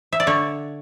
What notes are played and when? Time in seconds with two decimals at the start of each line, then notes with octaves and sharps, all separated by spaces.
0.13 E5
0.20 D5
0.27 D3 C#5